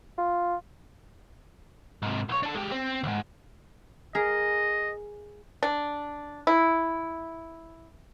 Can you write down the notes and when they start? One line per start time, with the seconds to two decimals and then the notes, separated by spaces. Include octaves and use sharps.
0.18 F4
2.02 G#2 C3
2.29 B1 C#5
2.43 D4 A4
2.55 G#3 G4
2.72 C4
3.04 D2 G#2
4.15 G#4 A#4 D#5
5.63 D4
6.47 E4